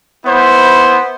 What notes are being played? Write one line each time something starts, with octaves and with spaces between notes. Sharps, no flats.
B3 E4 C5